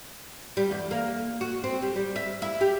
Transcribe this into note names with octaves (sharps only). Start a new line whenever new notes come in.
G3
E2
A#3
F#4
C4
G3
G3
E5
E4
G4